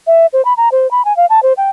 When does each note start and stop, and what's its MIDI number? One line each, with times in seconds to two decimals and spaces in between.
0.07 0.26 76
0.33 0.44 72
0.45 0.53 83
0.57 0.69 82
0.72 0.90 72
0.91 1.04 83
1.05 1.15 80
1.17 1.26 77
1.30 1.42 81
1.43 1.53 72
1.57 1.70 79